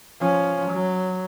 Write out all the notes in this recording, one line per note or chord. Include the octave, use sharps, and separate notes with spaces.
F3 C#4
F#3